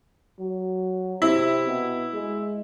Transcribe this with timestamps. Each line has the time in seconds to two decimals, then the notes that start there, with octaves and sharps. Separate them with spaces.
0.39 F#3
1.22 C3 E4
1.67 B2
2.14 G#3